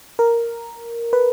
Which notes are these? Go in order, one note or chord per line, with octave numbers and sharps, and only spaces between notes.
A#4
B4